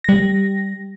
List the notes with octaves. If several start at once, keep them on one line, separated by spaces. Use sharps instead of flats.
G3 A#6